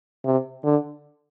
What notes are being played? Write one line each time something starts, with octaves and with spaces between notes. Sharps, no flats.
C3
D3